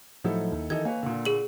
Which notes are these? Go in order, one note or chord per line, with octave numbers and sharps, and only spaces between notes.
A2 F3 F#3 D#4 E4 A4
D#2
D#3 E3 D#4 A4 D#5 G#6
A#3 B4 C#5 G#5
A#2 D3
G#4 F#7